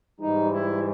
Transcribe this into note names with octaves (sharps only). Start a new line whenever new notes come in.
G#2 E3 G3 D#4
E4